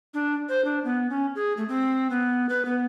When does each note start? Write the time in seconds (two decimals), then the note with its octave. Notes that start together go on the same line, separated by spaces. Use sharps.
0.14 D4
0.49 C5
0.65 D4
0.84 B3
1.10 C#4
1.35 G#4
1.57 A3
1.68 C4
2.10 B3
2.49 B4
2.65 B3